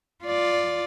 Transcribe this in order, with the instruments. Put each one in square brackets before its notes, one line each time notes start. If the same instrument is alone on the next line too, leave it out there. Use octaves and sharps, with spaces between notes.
[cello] F4 D5